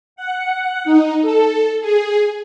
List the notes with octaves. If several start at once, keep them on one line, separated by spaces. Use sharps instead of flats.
F#5
D#4
A4
G#4